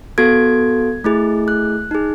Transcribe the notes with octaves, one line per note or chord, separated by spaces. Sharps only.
B3 F#4 A4 G#6
A3 E4 G#4
F#6
D#4 G#4